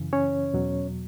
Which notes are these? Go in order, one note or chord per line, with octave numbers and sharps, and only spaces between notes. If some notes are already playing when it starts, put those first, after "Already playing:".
Already playing: F#2 C#3 E3
C#4 C#5
E2 B2 F#3